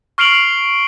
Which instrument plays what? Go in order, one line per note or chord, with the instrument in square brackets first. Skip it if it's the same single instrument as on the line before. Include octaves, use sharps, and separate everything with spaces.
[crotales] C#6 F6 C7 D7 F7 F#7